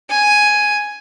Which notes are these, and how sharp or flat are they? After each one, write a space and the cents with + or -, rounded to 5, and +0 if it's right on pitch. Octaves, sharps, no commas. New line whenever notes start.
G#5 +5